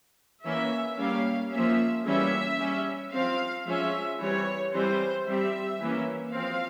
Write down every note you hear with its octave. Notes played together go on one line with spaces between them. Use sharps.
E3 A#3 C#4 E5
G3 A#3 C#4 F5
F3 A#3 C#4 E5
E3 G3 A#3 C#4 E5
G3 C#4
F3 C4 F5
F3 G#3 C#4 E5
E3 G3 C4 C#5
E3 G3 C4 C5
G3 C4 E5
E3 A#3 C#4
F3 C4 F5